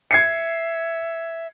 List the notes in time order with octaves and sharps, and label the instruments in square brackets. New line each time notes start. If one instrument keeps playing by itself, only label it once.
[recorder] E5 [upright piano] G#6 C7 C#7